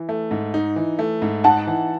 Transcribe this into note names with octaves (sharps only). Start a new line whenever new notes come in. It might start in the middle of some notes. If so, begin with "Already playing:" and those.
Already playing: E3
A3
G#2
D#4
E3
A3
G#2
D#4 F#5 A5
E3